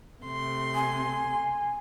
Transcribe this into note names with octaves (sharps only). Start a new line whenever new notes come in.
C3 A3 C6
G#5